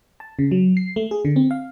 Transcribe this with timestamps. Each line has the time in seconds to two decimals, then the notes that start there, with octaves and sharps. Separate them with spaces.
0.20 A5
0.39 C#3
0.51 F#3
0.77 C7
0.96 A3
1.11 G#4
1.25 D3
1.36 C4
1.51 F5